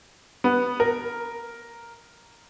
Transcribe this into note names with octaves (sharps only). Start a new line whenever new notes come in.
B3
A#4